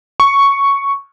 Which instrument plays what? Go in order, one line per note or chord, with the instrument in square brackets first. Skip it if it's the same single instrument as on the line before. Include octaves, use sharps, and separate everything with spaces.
[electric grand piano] C#6